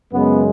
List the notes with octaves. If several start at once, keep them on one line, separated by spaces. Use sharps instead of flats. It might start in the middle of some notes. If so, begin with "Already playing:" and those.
F#2 C#3 G#3 B3